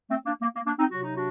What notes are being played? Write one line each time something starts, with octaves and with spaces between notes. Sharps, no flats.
A3 C4
A#3 D4
A#3
A#3
A#3 D4
C4 D#4
C3 F#3 F#4
D#4
D4 F#4